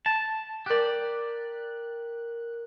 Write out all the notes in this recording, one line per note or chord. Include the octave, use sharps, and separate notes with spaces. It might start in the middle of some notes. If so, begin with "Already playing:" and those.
A5
G4 A#4 D5 F#6